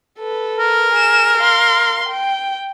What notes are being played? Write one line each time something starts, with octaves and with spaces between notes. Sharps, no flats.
A4 B4
A#4
G#4 E7
F5 C6
G5